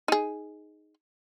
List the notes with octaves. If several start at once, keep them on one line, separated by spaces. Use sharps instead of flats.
D#4 G#4